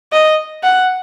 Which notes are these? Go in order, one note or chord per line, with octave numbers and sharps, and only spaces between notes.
D#5
F#5